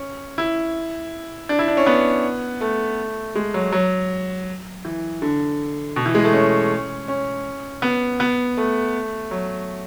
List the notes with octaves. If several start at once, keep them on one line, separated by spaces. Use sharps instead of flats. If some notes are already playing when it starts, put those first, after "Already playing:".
Already playing: C#4
E4
D4
E4
D4
C#4
B3
A3
G#3
F#3
F#3
E3
D3
B2
E3
G#3
A3
C#4
C#4
B3
B3
A3
F#3